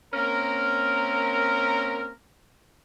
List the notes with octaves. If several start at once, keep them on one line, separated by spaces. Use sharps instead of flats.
A#3 C4 C#4 A#4